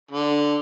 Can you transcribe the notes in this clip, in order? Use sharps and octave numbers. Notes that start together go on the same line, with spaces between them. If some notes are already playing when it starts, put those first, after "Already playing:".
D3